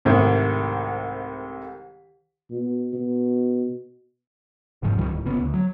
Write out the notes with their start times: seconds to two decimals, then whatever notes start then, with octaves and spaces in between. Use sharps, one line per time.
0.05 C2 G#2 D#3 A3
2.50 B2
2.93 B2
4.82 F1 G#2 C#3 F3
4.98 C#2 A#2 D#3 G3
5.11 D1
5.23 G1 C#3 B3
5.39 D2
5.54 F#3